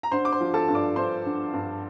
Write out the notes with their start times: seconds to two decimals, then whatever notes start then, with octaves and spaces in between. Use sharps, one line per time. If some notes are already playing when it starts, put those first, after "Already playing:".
0.03 A#5
0.11 D3 C5 C6
0.25 D6
0.32 C5 C6
0.40 F3
0.54 A4 A5
0.68 G2
0.75 D5 D6
0.96 G2 C5 C6
1.25 D3
1.53 G2